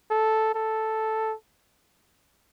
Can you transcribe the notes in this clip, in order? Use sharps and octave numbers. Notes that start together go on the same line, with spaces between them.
A4
A4